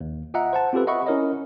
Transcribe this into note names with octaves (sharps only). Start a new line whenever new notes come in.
D#2
F4 D#5 E5 F#5 A#5
C5 F#5 A5
C4 F4 G4 A4 B4
D#5 E5 F#5 B5 C#6
C#4 E4 A#4 C#5 D#5